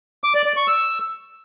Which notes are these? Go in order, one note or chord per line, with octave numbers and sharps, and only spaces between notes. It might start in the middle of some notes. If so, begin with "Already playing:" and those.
D6
D5
D5
C#6
E6